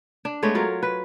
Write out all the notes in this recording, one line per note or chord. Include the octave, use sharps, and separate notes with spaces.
D4
G#3 A3 B3 C#5
F#3 F4 A#4
B4